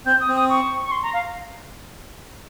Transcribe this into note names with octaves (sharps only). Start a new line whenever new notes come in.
C4 G6
D#6
C4
D#6
C#6
C#6
C6
A#5
F5